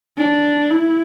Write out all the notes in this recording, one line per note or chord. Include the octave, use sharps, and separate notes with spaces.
D4
E4